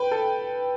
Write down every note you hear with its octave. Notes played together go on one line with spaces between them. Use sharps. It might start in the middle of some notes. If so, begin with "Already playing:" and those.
Already playing: B4 G5
A4